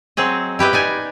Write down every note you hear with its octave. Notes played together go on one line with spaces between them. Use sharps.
F#3 C4 G#4 D#5
E4 G4 B4 D#5
D#4 D5 G#5